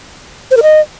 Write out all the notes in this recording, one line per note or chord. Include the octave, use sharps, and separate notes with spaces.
C5
A#4
D#5